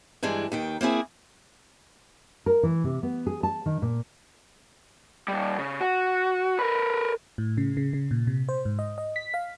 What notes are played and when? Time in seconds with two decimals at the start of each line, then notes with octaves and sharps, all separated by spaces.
0.23 G2 E3 G#3 D4
0.52 D#2 D#3 G5
0.81 A#3 C4 E4 G#4
2.46 A#4
2.63 E3
2.84 C3
3.03 B3
3.27 G#4
3.43 A5
3.66 D#3
3.82 A#2
5.28 A#2 G3
5.59 C#3
5.81 F#4
6.59 A#4 B4
7.38 A2
7.57 C#3
7.77 C#3
7.93 C#3
8.11 A#2
8.27 C3
8.49 C5
8.65 G#2
8.79 D#5
8.98 D#5
9.16 B6
9.34 F5